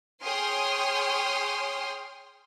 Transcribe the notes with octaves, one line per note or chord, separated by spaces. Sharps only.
G#4 C#5 G5 C6 D#6 F6